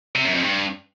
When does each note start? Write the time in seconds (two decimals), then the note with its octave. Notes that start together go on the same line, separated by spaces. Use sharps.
0.15 C3
0.25 F#2
0.34 F2
0.44 G2